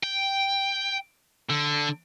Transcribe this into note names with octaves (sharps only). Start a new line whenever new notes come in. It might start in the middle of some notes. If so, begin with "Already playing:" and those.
G5
D3